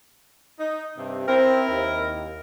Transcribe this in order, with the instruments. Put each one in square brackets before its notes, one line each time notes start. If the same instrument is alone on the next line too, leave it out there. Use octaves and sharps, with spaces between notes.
[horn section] D#4
G2 C3
[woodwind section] C4 [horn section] E4 A#4
[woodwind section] D#2